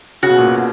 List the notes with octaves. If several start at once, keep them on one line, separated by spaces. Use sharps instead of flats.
C#3 F#4
B2
A#2
B2
B2